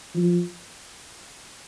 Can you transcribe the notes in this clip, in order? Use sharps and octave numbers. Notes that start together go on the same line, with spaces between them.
F3